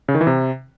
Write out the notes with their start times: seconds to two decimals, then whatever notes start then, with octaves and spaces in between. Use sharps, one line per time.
0.08 C#3
0.15 D#3
0.21 E3
0.27 C3